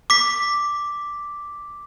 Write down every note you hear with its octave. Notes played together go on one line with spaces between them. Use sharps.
D6 B6